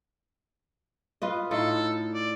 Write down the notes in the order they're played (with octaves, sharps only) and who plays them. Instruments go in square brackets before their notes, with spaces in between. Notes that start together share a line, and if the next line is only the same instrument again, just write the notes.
[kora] F4 B4 D#5
[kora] A2 D#4 F4 [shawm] A4
[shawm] D5